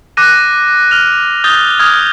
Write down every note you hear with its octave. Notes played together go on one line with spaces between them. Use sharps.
D6 F#6 A#6 D#7
F6 F7
D#6 G6 A6 G7
D#6 F6 G#6